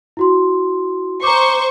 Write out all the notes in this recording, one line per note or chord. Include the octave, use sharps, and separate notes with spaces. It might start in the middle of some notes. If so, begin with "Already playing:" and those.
E4 F#4 C6
C5 A#5 C#6 D6